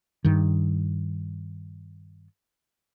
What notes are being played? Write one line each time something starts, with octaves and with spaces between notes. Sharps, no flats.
G2 D#3